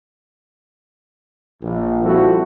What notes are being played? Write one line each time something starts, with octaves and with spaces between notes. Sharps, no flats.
A#1
F3 G3 C4 E4 F#4 A4